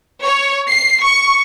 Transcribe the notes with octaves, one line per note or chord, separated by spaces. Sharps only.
C#5
C7
C#6